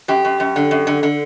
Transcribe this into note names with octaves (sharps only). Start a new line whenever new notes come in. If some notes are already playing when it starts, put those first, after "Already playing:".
F#2 G4
F#2
F#2
D3
F#2
D3
D3